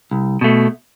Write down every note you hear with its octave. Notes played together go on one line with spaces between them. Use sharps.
C2
B2 A3